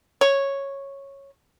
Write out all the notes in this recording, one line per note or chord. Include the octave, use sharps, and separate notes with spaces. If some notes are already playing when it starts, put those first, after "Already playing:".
C#5